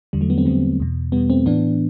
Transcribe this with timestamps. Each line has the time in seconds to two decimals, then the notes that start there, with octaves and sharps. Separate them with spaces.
0.13 E2 D3 G3
0.21 F#3 A3
0.30 G3 B3
0.38 A3 C4
0.46 E2 D3 G3 B3
0.80 E2 B2
1.12 E2 B2 G3 B3
1.30 A3 C4
1.46 A2 E3 B3 D4